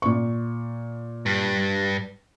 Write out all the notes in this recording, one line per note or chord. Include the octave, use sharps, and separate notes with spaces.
A#2 C#6
G2